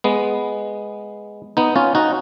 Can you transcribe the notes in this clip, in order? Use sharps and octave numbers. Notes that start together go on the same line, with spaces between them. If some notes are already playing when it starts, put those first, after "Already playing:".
G#3 B3
B3 D#4
C#4 F4
D#4 F#4